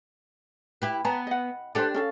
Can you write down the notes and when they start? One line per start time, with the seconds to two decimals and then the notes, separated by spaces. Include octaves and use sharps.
0.82 E4 G4 B4
1.05 B3 A5 A#5
1.27 D#5 F#5
1.75 D4 G4 A4 B4 C5
1.94 C#4 A4 F5